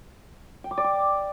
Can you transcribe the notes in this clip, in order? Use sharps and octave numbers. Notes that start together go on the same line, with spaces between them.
G5
D6
D5
D6